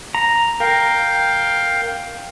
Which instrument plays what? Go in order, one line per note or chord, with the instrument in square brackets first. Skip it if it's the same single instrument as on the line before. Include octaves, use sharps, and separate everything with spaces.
[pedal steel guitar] A#5
[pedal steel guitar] A#4 [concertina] F5 G5